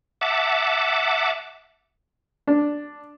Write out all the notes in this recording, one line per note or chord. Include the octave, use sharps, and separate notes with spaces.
E5 F#5 A5 D6
D4